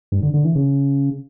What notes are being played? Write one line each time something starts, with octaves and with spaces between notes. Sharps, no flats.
G2
D3
D3
E3
C#3